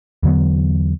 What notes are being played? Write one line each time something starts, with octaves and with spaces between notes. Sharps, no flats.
E2 D3 F#3 B3